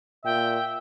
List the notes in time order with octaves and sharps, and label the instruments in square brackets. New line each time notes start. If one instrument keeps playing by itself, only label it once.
[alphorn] A#2 [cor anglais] E5 [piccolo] G5